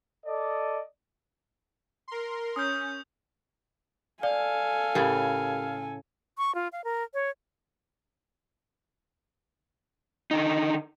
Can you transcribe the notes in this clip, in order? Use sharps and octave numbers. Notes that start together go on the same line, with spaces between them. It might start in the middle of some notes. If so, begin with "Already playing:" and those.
A4 D5 D#5
A#4 C6
C#4 D#6 G6
A4 D5 F5 G#5
A2 C#3 G4 A#4
C#6
F4
F5
A#4
C#5
D3 D#3 D#4